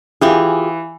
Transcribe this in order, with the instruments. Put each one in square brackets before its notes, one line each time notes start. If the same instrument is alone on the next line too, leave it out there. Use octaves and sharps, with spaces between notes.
[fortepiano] E3 [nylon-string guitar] F4 G4 G#4